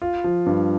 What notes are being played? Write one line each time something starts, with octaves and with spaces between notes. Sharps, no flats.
F4
F3
G2